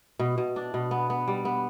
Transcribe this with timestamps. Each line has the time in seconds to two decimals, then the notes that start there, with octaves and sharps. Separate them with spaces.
0.19 B2
0.38 B2
0.56 D4
0.74 B2
0.91 B3
1.10 B3
1.28 G3
1.45 B3